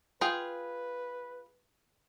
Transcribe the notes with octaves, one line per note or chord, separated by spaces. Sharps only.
F4 G#4 B4 G5